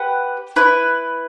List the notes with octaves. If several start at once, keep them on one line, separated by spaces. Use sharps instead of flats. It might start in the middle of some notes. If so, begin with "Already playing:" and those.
Already playing: G4 B4 F#5
E4 B4